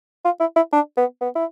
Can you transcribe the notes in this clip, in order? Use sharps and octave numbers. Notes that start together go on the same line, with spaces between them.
F4
E4
E4
D4
B3
B3
E4